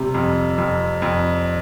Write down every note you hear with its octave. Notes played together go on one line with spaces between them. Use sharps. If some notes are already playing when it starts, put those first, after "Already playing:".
Already playing: C3 G3
F2
F2
F2